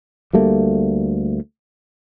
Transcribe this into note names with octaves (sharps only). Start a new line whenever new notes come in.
D2 G3 A3 A#3